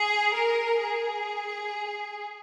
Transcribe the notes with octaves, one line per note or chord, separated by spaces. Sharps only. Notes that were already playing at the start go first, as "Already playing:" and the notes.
Already playing: G#4
A#4
G#4